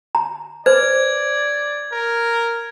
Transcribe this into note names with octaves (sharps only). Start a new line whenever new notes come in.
A#5
B4 C5 D5 G#6
A#4